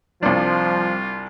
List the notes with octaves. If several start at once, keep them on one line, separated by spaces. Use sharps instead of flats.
C2 F3 G3 C4 D4 F4